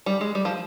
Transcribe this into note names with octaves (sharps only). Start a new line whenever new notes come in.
G3
G#3
G3
F3